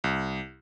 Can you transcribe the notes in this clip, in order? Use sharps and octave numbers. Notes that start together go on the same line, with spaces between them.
C2